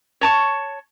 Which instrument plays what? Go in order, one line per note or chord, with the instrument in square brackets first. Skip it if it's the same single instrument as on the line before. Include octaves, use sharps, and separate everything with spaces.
[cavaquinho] C#5 A5 C#6